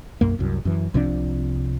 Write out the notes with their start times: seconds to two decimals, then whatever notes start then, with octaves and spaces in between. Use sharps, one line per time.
0.21 B1 F#2 A#3
0.39 C2 F#2
0.65 F#2 E3
0.94 C2 C3 F3 D4